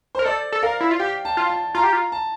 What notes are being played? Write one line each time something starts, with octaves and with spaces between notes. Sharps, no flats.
A#4 C5
A4 D5
A4
A#4 F5
E4
F4
G4 G5
A5
F4
A5
F4 A#5
G4
F4
A5